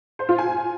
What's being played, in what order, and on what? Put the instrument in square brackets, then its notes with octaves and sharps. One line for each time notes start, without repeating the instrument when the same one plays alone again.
[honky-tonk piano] C5
F4
G#5